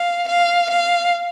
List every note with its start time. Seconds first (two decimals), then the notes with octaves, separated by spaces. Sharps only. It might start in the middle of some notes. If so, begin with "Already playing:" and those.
Already playing: F5
0.29 F5
0.71 F5